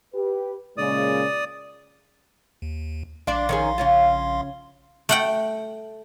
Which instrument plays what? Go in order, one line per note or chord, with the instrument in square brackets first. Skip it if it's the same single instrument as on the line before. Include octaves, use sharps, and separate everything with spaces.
[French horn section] G4 B4
[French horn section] A#2 C#3 G#3 [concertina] D5 D#6
[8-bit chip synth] D#2
[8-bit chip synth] A#1 F5 C6 [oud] D4 D5
[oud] D#3 C#4 G#4
C#3 C#4 F4
[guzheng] A3 F#5 G5